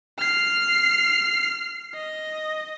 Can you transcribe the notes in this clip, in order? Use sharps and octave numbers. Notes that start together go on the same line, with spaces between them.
F6 C7
D#5